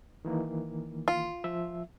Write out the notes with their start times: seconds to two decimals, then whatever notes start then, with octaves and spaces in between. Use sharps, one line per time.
0.25 D#3 E3 A#3
1.08 F4
1.44 F3 E5